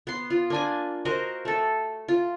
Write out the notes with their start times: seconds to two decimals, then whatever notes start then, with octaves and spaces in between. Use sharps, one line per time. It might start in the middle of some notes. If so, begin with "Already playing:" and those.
0.07 B3 C6
0.30 F4
0.50 A#3 D4 G#5
1.05 F#4 A#4 C5 D#5
1.45 A3 A4
2.08 F4